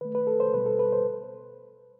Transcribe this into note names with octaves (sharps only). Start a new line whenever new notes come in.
D#3 A3 B4
B4
A4
C5
B2 G3 B3 B4
A4
B4
C5